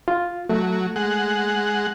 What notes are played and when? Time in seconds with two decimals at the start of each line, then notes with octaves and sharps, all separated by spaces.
0.08 F4
0.49 F#3 A3
0.96 G#3 F#5